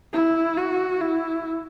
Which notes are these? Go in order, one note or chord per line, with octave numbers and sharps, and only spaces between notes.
E4
F#4
E4